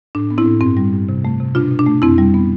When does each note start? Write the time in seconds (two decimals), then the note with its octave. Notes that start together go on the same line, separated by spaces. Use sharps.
0.15 A2 D4
0.30 B3
0.38 C4 E4
0.46 A2
0.61 G2 C4
0.77 G3
0.93 G2
1.09 C3
1.25 A3
1.40 C3
1.55 B2 D4 F4
1.71 B2
1.79 D4
1.87 A3
2.02 F2 C4 E4
2.18 G3
2.34 B3